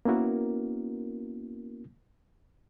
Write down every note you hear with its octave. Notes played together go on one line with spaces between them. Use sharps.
A#3 B3 C#4 E4 F#4 A#4